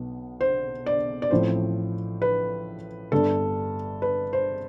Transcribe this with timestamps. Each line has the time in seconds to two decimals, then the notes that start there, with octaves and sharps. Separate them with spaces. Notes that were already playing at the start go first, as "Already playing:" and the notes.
Already playing: B1 B2 B3
0.41 C5
0.86 D5
1.22 D5
1.31 A1 A2 F3 A3 C4 C5
2.22 B4
3.12 G1 G2 D3 A4
4.02 B4
4.33 C5